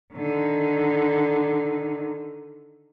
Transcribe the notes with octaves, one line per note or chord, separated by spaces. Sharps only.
D3 D#3